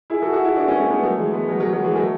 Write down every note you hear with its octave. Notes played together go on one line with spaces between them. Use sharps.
E4 G#4
F#4 A4
F#4 A4
E4 G#4
D4 F#4
C#4 E4
A3 C#4
G#3 B3
F#3 A3
E3 G#3
G#3 B3
F#3
F#3
F#3
E3 G#3
F#3 A3